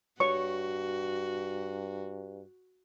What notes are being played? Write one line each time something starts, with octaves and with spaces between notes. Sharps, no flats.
G2 F#4 C#5 C#6